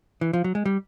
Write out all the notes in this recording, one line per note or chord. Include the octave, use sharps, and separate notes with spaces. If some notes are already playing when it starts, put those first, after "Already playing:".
E3
F3
F#3
G#3
G3